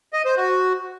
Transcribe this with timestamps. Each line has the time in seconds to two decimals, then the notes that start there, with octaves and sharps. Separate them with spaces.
0.13 D#5
0.25 C5
0.37 F#4